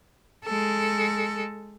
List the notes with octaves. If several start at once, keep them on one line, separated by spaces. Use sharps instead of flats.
G#3 A4